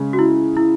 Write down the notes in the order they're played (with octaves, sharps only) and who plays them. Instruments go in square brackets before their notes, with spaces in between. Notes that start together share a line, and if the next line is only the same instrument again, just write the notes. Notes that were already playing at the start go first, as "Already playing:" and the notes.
Already playing: [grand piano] C#3 G#3 C#4
[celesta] F#4
E4
E4